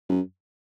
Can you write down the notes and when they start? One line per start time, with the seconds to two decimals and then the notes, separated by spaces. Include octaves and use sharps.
0.09 F#2